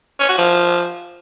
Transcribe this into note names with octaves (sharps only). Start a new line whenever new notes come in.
C#4
F#4
F3